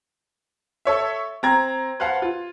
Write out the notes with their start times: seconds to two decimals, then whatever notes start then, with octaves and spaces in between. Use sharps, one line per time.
0.85 A4 C#5 E5
1.43 C4 A#5 G#6
2.00 B4 C5 F5 F#5 A5
2.22 F4